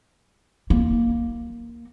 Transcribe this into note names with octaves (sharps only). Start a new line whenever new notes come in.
A#3